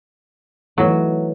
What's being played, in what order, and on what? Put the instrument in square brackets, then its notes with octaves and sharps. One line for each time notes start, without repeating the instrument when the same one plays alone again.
[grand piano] E3 A3 D#4 [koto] F#3